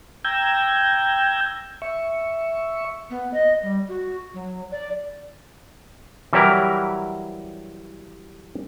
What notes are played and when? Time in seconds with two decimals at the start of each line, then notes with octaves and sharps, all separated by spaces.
0.25 G5 A#5 E6 G6 G#6
1.82 E5 C#6
3.10 B3
3.34 D#5
3.62 G3
3.88 F#4
4.34 F#3
4.71 D5
6.33 E3 F#3 G3 E4 G4 A#4